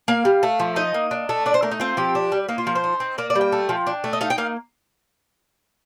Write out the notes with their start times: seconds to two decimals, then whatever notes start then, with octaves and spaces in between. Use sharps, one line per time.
0.08 A#3 F5
0.25 G3
0.43 A3
0.60 F3
0.76 D#4 D#5
0.94 A#3
1.11 D4
1.29 A3
1.46 D4 D5
1.54 C5
1.62 A3 A#4
1.71 D#4
1.80 C4 F4
1.97 F3 G4
2.15 D4
2.32 G3
2.48 A#3 D#4
2.58 F4
2.67 F3 A#4
2.75 C5
2.84 D#4
3.00 C4
3.18 A#3 D5
3.30 D5
3.35 G3
3.41 G5
3.52 A3
3.69 F3
3.87 D4
4.04 A3
4.13 D#5
4.21 D#4 F5
4.30 G5
4.38 A#3 F5